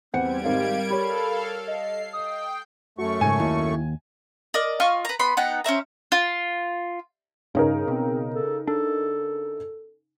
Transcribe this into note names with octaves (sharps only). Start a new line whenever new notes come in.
E2 G3 C4 C5 F#5 G#6 C#7 D7
G#1 G#2 C4 A#4 F5
G4 A4 C#5 F5 B5
D#5 C7
D#5 G5 D#6
F#2 A3 F#4 C#6
G#2 C#3 G#5
D#2 E4
A#4 D5 D#5
F4 D#5 C#6 F6
B4 A#5
B3 B5 C6
B3 D#4 F#5 G5
C#4 C5 E5 A#5
F4
G2 C#3 C#4 D#4 A#4
B2 C4
A4
D4 A4